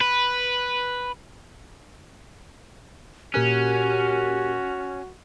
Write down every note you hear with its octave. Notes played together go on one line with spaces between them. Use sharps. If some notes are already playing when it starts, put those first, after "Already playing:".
B4
A#2 C#4 F#4 G4 A#4 F#6